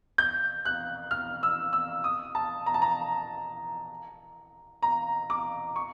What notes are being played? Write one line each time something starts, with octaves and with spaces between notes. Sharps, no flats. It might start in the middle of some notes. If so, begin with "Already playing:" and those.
G6
F#6
F6
E6
E6
D#6
A5
A#5
A5
A#5
A#5
D6
C#6